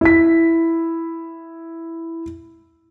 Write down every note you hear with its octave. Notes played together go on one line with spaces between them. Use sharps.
E4 B6